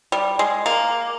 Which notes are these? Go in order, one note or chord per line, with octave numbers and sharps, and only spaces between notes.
G3
G#3
A#3